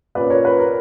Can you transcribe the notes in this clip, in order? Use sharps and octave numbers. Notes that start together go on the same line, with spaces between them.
A#2 A#3 C#4 B4 D5
A#4 C#5
B4
A#4